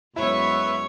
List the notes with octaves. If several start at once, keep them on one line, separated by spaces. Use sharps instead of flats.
F#2 G#3 B3 E4 B4 C#5 E5